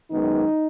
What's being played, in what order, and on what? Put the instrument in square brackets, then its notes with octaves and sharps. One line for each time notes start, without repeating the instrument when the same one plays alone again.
[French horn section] F#2 D#3 G#3 B3 D#4